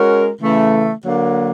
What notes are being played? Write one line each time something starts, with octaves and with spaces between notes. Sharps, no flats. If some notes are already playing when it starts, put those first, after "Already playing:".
Already playing: G#3 C#4 F#4 A#4
C#3 E3 A3
D3 F#3 A#3